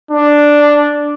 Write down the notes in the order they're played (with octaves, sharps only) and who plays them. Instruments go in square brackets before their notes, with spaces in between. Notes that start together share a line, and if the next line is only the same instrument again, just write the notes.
[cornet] D4